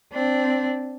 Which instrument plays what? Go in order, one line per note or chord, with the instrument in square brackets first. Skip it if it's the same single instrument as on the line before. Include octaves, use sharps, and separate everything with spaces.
[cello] C4 D4